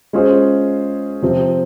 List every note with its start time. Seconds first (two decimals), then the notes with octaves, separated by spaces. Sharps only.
0.13 G#3 C#4 F4 G#4 C5
1.22 C3 F3 C4